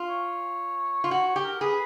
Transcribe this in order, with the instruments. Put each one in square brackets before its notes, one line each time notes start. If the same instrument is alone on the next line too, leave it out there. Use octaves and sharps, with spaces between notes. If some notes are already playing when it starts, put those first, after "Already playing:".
Already playing: [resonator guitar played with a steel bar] F4
[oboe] C#5
[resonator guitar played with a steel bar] F4
[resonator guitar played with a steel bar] F#4 [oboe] C#5
[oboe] C#5
[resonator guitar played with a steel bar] G4
[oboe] A#4
[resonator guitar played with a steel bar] G#4 [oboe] B4